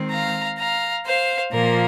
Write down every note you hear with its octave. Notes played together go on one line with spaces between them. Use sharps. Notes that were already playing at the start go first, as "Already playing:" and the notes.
Already playing: D#3 G#3 C4
F5 A#5
F5 A#5
C5 F5
A#2 F3 A#3 A#4